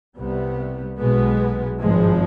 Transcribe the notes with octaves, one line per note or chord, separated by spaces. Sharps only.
C2 C3 G3 B3
B1 B2 G#3 B3
G#1 G2 F3 G#3